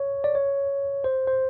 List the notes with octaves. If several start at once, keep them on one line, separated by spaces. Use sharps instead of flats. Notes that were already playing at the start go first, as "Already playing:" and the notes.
Already playing: C#5
D5
C#5
C5
C5